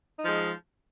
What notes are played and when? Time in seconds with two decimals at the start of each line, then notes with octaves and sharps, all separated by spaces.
0.19 D#4
0.23 F3
0.27 G#3